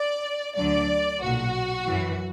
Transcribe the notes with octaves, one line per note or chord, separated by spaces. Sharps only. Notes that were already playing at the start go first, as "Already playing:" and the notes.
Already playing: D5
D2 D3 F#3 D5
B1 A#2 F#3 F#4
F#2 E3